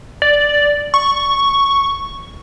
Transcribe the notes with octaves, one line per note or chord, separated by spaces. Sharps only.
D5
C#6